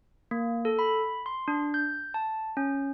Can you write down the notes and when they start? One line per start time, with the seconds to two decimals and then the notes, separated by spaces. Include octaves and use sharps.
0.31 A#3
0.65 A4
0.79 B5
1.26 C6
1.48 D4
1.74 G6
2.14 A5
2.57 C#4